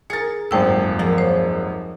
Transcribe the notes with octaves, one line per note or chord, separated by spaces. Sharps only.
G#4 A#4 A6 C#7
D#1 G#1 F#2 C5 G5 E6
F3 G#3 A#3
C5 C#5